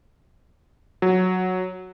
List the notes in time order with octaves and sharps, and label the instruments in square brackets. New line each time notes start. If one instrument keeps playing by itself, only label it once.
[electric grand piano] F#3